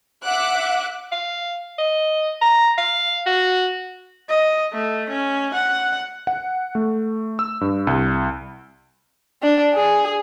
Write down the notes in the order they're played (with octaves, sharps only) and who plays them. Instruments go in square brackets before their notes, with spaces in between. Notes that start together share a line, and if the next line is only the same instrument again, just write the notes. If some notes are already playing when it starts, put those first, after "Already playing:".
[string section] E5 F#5 D6 F#6
[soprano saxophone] F5
D#5
A#5
F5
F#4
[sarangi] D#5
A3
C#4
F#5
[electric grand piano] F#5
A3
E6
G2
C2
[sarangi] D4
G#4